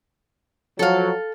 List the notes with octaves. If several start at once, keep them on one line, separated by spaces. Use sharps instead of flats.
F3 F#3 A4 F5